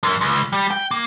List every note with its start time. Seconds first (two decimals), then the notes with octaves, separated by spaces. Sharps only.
0.03 F#2
0.21 C#2
0.53 G3
0.71 G5
0.91 A#3